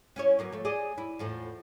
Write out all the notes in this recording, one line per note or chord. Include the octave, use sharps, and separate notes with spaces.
C#4 E4 C#5
F#3 A#3 B3
F3 A3
G#4 D5 D#5
E4
E2 A2 F3